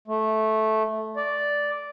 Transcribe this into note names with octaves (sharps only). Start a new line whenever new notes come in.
A3
D5